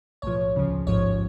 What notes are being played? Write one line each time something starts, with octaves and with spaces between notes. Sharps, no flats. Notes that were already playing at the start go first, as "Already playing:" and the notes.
B1 A2 F3 C#5
D2 C#3 F3
A1 G#2 F3 C#5